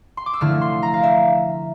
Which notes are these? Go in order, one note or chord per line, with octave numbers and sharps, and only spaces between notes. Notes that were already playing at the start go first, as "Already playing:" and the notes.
C6
D6
E6
D3 F3 A3 E4 F6
C6
A#5
F5
E5